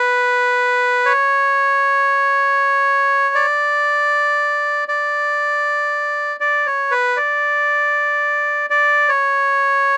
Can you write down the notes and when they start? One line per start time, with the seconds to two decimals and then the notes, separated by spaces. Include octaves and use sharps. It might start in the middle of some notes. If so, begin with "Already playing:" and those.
Already playing: B4
1.06 C#5
3.35 D5
4.88 D5
6.40 D5
6.67 C#5
6.91 B4
7.17 D5
8.70 D5
9.09 C#5